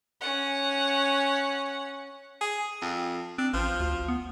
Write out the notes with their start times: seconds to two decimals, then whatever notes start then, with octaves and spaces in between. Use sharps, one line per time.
0.21 C#4 F#5
2.41 G#4
2.82 F2
3.38 C4 D4
3.54 A1 F3
3.80 D2
4.08 B3